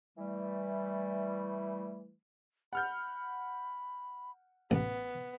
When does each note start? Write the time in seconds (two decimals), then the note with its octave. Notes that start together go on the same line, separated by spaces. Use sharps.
0.17 E3 G3 A3
2.73 F#5 B5 F6 G6
4.71 A1 B3